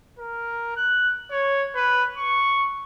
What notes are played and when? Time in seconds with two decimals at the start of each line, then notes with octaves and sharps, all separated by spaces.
0.19 A#4
0.76 F#6
1.31 C#5
1.75 B4
2.18 C#6